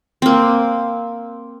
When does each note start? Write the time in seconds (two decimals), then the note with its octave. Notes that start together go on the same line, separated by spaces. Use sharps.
0.22 A#3 C4